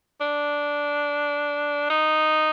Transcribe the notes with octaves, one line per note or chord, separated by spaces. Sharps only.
D4
D#4